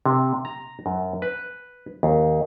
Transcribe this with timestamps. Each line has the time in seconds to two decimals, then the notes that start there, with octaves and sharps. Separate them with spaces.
0.06 C3
0.45 A#5
0.86 F#2
1.22 B4
2.03 D#2